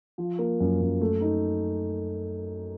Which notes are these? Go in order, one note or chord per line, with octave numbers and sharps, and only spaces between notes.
F3
A#3
F#2
F#2
A3
D#4